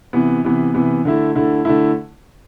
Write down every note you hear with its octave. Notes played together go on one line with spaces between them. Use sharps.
C3 E3 B3
C3 E3 B3
C3 E3 B3
D3 A3 E4
D3 A3 E4
D3 A3 E4